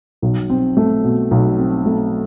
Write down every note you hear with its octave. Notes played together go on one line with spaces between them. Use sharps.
B1
C4
A3
B2
B1
C4
A3